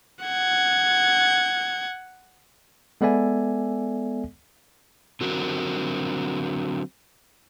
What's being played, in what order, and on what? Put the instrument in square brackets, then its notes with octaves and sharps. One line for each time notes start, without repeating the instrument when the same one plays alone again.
[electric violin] F#5 G#6
[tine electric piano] G#3 B3 A4 D5 E5 G#5
[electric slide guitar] D3 F#3 C4 F#4 A#4